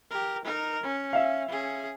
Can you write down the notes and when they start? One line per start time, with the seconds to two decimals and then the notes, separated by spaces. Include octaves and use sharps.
0.11 G4 A#4
0.44 D#4 A#4
0.83 C#4
1.13 E5 F5
1.49 C#4 G#4